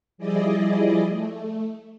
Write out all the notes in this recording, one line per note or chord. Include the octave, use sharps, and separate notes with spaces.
F3 G3 E4 G#4 D5 D#5
A3